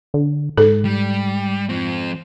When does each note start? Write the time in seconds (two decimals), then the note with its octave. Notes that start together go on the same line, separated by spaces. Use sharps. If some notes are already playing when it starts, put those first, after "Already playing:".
0.14 D3
0.57 G#2 A4
0.85 G3
1.69 F3 C4